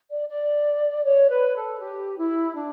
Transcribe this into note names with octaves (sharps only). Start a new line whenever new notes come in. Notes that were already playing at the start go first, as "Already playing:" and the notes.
D5
D5
C#5
B4
A4
G4
E4
D4